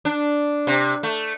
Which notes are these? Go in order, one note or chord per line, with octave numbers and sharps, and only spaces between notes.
D4
C3
A3